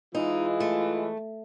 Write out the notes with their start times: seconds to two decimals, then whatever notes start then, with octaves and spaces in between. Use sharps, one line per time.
0.15 E3 G#3 D#4 F4
0.60 A3